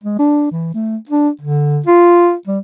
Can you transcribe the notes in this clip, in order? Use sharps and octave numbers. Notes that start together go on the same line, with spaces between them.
G#3
D4
E3
A3
D4
D3
F4
G3